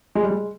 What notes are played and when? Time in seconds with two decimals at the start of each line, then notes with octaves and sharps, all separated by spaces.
0.15 G#3
0.23 G3
0.31 G#3